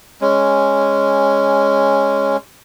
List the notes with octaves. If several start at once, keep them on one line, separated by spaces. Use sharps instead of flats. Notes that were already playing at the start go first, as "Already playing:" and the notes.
G#3 C#4